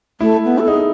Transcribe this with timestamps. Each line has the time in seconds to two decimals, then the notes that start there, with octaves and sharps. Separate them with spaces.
0.21 A3 E4
0.45 B3
0.59 A4
0.68 D#4 G#4